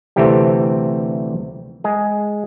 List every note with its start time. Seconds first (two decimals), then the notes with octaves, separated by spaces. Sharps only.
0.16 D2 C3 E3 G3 A3 C4 G4
1.84 G#3 G#4